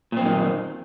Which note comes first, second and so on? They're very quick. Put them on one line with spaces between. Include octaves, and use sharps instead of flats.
A#2 C4 F#2 D#3